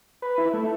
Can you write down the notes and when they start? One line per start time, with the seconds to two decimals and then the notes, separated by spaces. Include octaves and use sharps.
0.22 B4
0.38 E4
0.54 A3